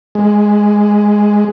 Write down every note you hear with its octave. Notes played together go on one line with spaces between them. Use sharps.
G#3